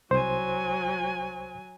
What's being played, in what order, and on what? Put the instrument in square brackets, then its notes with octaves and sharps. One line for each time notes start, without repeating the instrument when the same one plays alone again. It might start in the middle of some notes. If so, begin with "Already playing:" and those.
[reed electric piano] C2 C5 C6 [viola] F#3 G#5